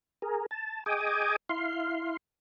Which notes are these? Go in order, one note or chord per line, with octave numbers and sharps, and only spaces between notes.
G#4 A#4
A5
G#4 D#5 G5 G#5 D6 D#6
E4 F5 C6